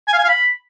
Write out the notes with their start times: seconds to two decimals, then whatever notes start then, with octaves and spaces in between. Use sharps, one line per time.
0.08 G#5
0.13 F5
0.18 G#5
0.24 F5
0.29 B5